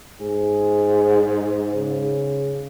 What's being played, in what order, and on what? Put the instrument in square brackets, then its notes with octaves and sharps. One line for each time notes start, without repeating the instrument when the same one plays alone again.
[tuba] G#2 [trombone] G#4
[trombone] C#3